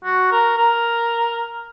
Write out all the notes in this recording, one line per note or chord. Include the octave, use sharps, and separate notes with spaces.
F#4
A#4
A#4